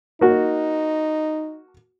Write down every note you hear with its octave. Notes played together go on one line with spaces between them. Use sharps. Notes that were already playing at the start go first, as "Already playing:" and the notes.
A#3 D#4 F#4